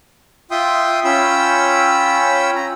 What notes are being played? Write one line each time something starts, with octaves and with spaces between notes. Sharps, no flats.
F4 E5 G5 C6 D#6
C#4 F4 G5 B5 E6
A#5